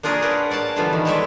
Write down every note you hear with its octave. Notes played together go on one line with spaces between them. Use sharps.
A#3 D4 F4 G#4 A#4 C#5
A#4 B4 D5 F#5
C#5 D5 F5 A5
D3 E3 F3 G3 B3 F4
D#3
G#3 G4 A4 C#5 D5 E5